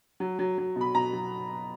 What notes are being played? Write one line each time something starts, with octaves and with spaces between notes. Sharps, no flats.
F#3
F#3
F#3
B2 B5
B2 A#5
F#3